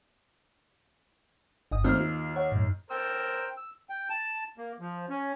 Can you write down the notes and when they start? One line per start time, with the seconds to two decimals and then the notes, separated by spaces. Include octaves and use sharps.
1.71 G1 D#5 D#6
1.84 D#2 A3 C4 C5 F6
2.01 F4
2.36 C#5 F#5
2.52 F#2 A2
2.91 A#4 C5 G5 E6
3.57 E6
3.90 G5
4.10 A5
4.57 A#3
4.80 F3
5.10 C#4